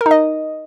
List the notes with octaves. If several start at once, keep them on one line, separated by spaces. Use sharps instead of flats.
A#4
D#4
D#5